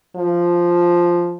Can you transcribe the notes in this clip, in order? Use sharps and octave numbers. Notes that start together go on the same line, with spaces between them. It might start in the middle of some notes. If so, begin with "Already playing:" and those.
F3